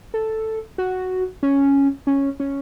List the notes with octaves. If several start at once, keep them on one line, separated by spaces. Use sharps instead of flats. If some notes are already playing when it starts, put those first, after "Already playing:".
A4
F#4
C#4
C#4
C#4